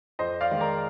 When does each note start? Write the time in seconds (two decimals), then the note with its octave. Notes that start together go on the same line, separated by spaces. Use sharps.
0.19 F2 C5 D#5
0.41 D5 F5
0.51 D#3 G#3
0.61 A#4 D5